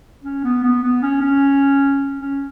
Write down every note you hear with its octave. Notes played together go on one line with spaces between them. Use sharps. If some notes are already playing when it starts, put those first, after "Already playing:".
C#4
B3
B3
B3
C#4
C#4
C#4